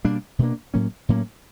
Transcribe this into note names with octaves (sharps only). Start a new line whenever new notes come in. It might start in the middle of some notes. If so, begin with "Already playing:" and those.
B2 G3 A#3 D4
B2 G3 A#3 D4
A2 F#3 A#3 C#4
A2 F#3 A#3 C#4